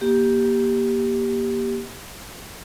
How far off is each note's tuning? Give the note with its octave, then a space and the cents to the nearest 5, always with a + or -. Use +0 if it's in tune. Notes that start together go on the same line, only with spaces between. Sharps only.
A#3 +25 G4 +0